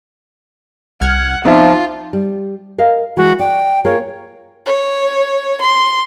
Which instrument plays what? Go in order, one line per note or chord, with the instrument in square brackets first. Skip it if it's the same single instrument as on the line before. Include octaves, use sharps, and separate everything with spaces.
[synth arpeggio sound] C2 F6 G#6 [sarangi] F#5
[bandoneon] F3 [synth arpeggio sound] B3 C4 D5 [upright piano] D#4 E5 [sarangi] F4
[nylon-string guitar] G3
A#4 D#5 F5
[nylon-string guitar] E3 G#3 [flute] F#4
[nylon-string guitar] D5 [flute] G5
[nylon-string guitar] A#3 F4 G#4 [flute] C#5
[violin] C#5
C6